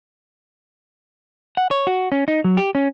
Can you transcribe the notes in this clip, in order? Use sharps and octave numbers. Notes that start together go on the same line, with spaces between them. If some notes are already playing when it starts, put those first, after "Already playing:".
F#5
C#5
F#4
C#4
D#4
F#3
G4
C#4